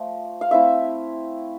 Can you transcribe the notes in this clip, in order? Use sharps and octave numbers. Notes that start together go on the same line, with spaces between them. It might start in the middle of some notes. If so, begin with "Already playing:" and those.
Already playing: F3 A3
F5
A3 C4 E4 E5